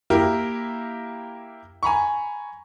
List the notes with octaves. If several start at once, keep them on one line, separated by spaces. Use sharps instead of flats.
A#3 E4 G4 A#4
G#5 A#5 B5 C#6